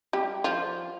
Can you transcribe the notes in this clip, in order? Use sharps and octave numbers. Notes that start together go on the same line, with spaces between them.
G3 G4
F3 F4